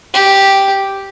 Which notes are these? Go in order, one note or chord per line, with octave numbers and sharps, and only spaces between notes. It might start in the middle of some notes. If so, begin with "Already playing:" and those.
G4